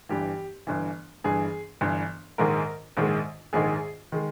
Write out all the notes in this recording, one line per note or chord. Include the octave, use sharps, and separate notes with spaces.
G1 G2 E3 G4
G1 G2 E3
G1 G2 E3 G#4
G1 G2 E3
A#1 G#2 D#3 G#3 A#4
A#1 G#2 D#3 G#3
A#1 G#2 D#3 G#3 G#4
D#3 G#3